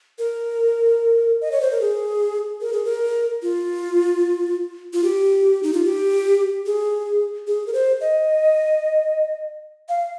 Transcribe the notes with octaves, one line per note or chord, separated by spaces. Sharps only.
A#4
D#5
C#5
C5
A#4
G#4
A#4
G#4
A#4
F4
F4
G4
D#4
F4
G4
G#4
G#4
A#4
C5
D#5
F5